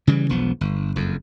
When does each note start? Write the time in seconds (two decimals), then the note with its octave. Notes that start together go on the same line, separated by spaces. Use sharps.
0.07 C#3 E3 G3
0.29 E1 B1 F3 B3
0.61 G1
0.96 F#1 F2